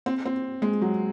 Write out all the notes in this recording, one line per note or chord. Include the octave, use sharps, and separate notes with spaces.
C4
C4
G#3
F#3